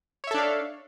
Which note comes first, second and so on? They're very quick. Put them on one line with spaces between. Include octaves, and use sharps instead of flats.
C#5 E5 A4 D4 F5